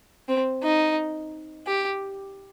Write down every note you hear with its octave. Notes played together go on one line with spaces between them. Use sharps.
C4
D#4
G4